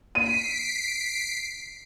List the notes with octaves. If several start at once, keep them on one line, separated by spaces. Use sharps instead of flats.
B6 C7 D7 D#7